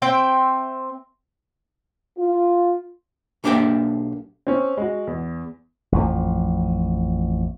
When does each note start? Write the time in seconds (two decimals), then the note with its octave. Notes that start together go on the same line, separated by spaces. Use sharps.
0.02 C4 E5 G5
2.18 F4
3.44 B1 A#3 D4 G4 E5 G5
4.47 C4 C#4
4.77 G#3 F#4
5.07 E2
5.92 A1 F2 F3